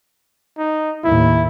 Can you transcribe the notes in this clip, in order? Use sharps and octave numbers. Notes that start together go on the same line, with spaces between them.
D#4
D#2 A2 E4